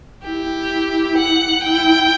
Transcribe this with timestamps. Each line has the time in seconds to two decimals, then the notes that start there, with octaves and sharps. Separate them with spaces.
0.23 E4 G4
1.17 F#5
1.63 E4 G5